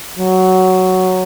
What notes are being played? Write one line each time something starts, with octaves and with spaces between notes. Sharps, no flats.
F#3